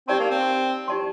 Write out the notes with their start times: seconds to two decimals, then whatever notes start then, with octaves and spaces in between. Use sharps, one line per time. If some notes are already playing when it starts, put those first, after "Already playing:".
0.08 C4 D#4 G4 D5 A5 C6
0.19 A#3
0.31 C4
0.88 D#4 G4 D5 A5 C6